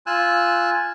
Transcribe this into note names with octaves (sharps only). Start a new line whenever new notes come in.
F4 G#5 E6 F#6